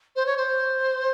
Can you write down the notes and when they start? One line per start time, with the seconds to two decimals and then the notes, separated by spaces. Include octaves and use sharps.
0.15 C5
0.26 C#5
0.37 C5